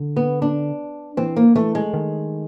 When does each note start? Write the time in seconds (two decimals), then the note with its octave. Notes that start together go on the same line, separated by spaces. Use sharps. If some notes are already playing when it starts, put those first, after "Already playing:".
Already playing: D3
0.16 B3
0.42 D4
1.17 E3 C4
1.36 A#3
1.56 E3 A3
1.75 G#3
1.94 D#3